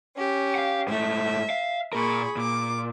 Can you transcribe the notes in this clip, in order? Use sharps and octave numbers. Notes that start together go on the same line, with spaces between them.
C#4 G4
F5 F#5
G#2 A3 E5
F5
A#2 G#4 A#4 B5 C#6
A#2 D6